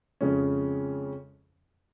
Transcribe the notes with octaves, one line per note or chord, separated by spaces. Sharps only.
F2 C#3 G#3 C#4